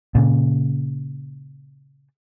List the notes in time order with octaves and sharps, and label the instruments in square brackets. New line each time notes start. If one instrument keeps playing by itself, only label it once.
[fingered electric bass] A#2 C#3